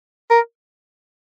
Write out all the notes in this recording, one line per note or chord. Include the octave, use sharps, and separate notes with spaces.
A#4